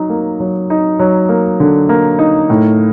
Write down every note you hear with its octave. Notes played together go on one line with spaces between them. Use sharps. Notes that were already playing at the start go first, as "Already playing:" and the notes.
Already playing: F#3 D#4
A#3
F#3
D#4
F#3
A#3
D3
A#3
D#4
A2